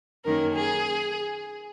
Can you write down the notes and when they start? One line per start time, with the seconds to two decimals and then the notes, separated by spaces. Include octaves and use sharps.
0.25 F#2 D#3 A#3 C#4 A#4
0.55 G#4